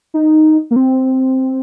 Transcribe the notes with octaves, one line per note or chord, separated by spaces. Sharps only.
D#4
A#3
C4